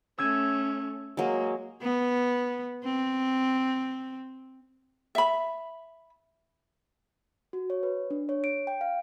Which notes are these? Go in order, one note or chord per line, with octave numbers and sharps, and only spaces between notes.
A3 C#4 E6 G#6 D#7
F#3 G#3 A#3
B3
C4
E5 B5
F#4
C#5
B4
D4
C#5
D7
G5
F5